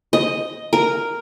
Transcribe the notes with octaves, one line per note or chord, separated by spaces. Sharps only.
D#5
A#4